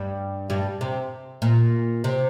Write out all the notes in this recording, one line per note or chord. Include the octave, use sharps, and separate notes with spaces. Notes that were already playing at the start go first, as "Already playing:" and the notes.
Already playing: G2 G3
G2 G3
C3
A#2
C3